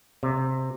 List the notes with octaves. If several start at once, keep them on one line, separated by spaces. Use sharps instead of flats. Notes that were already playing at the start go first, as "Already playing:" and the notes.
C3